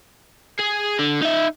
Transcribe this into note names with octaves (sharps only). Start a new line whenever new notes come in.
G#4
D3
D#4 E5